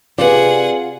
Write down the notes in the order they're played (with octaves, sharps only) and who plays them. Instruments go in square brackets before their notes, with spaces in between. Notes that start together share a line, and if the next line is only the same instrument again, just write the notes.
[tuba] C3 [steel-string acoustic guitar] F4 [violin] G#4 F#5 [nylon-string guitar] B4 D5